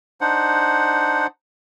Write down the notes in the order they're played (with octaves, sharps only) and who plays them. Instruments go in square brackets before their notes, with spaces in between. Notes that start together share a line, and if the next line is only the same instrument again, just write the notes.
[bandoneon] D4 D#4 C5 F#5